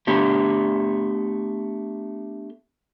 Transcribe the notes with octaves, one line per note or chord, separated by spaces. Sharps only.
A3 B3 D4 G4